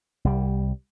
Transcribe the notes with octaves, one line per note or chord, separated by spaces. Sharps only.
C2 G3